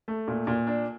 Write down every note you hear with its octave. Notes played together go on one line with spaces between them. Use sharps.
A3
A#2
A#2
D4